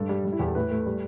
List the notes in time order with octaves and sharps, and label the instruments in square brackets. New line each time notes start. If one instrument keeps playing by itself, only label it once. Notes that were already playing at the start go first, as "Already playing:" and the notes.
Already playing: [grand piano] G2 A4
G3
G3
E4
E2 G4
A4
A2 B4
A3
G3